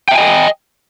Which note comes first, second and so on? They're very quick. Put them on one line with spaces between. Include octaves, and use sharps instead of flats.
G5 E5 G#5 D#5